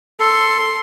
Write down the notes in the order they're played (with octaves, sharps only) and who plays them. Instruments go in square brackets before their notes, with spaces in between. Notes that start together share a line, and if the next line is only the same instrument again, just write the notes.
[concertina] A4 [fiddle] C6